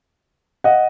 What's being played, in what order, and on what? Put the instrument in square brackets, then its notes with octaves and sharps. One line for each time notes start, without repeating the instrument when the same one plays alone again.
[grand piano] D#5 F#5